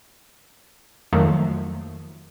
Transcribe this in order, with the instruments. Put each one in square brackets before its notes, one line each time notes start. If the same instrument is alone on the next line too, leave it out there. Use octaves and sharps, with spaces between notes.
[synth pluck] F2 D#3 F3 F#3 A3 A#3